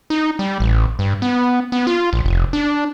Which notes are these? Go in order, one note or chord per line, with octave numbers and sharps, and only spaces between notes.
D#4
G3
A1
G2
B3
B3
F4
A#1
F1
D4